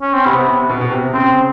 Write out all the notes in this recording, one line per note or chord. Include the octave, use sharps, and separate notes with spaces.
C#4
C4
C3 B3
C3
B2
B2
C3
C#3 C4